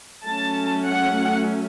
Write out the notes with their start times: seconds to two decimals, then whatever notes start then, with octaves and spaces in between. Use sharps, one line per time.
0.25 F#3 A3 C#4 A5
0.86 F#5